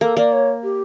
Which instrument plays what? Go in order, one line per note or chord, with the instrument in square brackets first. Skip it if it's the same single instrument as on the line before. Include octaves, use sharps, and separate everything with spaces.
[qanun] A#3 [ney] A4
[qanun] A#3 [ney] D5
[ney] C#5
G4